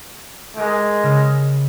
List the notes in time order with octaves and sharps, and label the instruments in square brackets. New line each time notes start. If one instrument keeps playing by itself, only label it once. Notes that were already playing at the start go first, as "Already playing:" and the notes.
[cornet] G#3 [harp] G4 G#4 A#4
[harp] C#3 F6 A#6